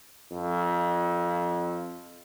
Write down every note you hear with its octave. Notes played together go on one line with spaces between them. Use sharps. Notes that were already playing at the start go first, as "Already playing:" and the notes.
F2